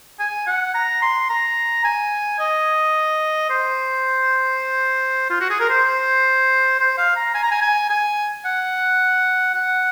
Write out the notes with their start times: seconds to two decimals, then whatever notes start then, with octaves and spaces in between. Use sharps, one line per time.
0.20 G#5
0.47 F#5
0.75 A#5
1.02 C6
1.30 A#5
1.84 G#5
2.40 D#5
3.50 C5
5.30 F4
5.41 F#4
5.50 G#4
5.60 A#4
5.70 C5
6.80 C5
6.98 F5
7.16 A#5
7.35 G#5
7.43 A#5
7.52 G#5
7.62 G#5
7.90 G#5
8.45 F#5
9.54 F#5